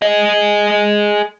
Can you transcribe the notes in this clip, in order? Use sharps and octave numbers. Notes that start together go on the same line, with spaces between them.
G#4 D#5